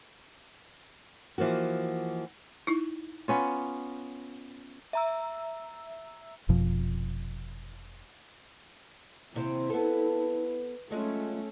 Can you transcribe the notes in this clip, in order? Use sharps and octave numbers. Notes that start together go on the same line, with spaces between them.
E3 F3 A#3 F#4
D#4 E4
B3 C#4 F4
E5 A#5 E6
F1 F2 B2 F3
D#2 C3 C4 E4
B3 A4 B4
F#3 G#3 A3 C#4 F4